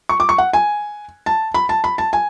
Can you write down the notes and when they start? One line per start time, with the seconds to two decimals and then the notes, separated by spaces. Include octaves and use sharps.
0.09 C#6
0.20 D6
0.29 C#6
0.38 F#5
0.53 G#5
1.26 A5
1.54 B5
1.69 A5
1.84 B5
1.98 A5
2.13 G#5